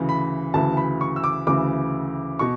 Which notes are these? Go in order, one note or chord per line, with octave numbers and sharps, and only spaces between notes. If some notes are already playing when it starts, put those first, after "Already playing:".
Already playing: D2 C#3 E3
B5
D2 C#3 E3 A5
B5
C#6
E6
D6
D2 C#3 E3 D6
B2 C#6